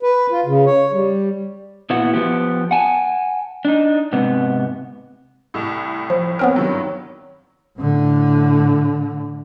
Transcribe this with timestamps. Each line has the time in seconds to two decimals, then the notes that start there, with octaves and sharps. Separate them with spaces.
0.03 B4
0.32 F4
0.46 C#3
0.66 C#5
0.92 G3
1.90 A#2 B3 E4 F#4
2.13 F3 B3 G4
2.71 F#5 G#5 A5
3.65 D4 D#4
4.13 G#2 C3 B3
5.54 C2 A2
6.10 F3
6.39 B3 C4 A#4 C#5
6.56 G2 D#3 F#3
7.79 A2 D3